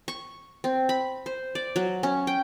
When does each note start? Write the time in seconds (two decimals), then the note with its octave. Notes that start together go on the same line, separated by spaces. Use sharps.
0.08 C#6
0.64 C4
0.89 B5
1.26 C5
1.55 D5
1.76 F#3
2.03 C#4
2.27 G5